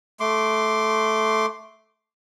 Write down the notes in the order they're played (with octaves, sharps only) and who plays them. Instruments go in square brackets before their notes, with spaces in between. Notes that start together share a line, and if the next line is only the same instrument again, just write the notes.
[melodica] A3 C6 D6